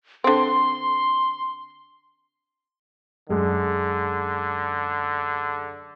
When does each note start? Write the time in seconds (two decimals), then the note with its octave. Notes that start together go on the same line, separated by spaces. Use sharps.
0.24 D3 C4 C6
3.29 F#2 D3 G#3 G#4